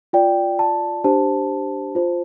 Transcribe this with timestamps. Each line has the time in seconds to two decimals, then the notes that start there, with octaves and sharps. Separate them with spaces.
0.13 F4 D5 G5
0.59 A5
1.04 D4 G4 C5 A5
1.95 F4 C5